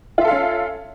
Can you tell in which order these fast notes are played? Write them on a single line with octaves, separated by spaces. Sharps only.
F4 E5 A4 F5 C#4